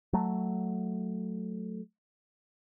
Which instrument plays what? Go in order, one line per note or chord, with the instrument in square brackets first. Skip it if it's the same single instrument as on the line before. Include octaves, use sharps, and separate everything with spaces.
[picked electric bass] F#3 A3